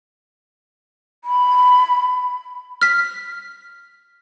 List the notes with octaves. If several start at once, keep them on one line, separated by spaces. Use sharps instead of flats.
B5
F6 B6